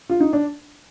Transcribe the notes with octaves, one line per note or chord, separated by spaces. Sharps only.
F4
D#4
D4